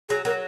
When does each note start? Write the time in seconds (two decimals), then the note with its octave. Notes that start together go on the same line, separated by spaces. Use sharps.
0.09 F#3 G#4
0.25 F#3 A#4